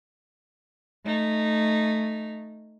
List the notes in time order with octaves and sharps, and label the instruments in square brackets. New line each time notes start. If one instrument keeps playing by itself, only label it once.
[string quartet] A3 D#4